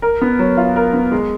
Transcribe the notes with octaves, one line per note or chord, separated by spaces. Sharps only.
A#4
B3
F#3
F4
A#4
B3
G#3